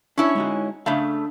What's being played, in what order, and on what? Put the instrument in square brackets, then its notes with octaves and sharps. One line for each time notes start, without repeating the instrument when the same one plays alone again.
[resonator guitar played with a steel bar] C#4 E4 C#5 [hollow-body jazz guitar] D4
[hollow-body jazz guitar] G#3 D#4 F#4
[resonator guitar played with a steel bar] C#3 A3 [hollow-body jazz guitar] D4 E5 F5